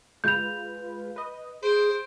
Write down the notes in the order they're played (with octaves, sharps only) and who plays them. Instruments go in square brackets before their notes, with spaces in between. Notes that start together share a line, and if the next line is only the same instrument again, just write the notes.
[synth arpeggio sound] G#3 F4 B4 [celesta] G6 F7
[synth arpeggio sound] B4 D#5
[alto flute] G#4 [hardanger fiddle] C5 [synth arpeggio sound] D7